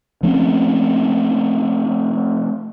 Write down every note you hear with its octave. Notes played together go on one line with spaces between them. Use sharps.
F3 A3 C4 C#4